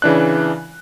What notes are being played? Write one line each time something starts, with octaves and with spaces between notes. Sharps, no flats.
C#3 E3 D4 F#6